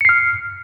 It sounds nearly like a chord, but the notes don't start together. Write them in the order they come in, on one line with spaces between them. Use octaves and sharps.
C#7 C7 F6